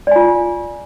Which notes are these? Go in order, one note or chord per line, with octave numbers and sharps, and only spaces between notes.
F4 D5 G#5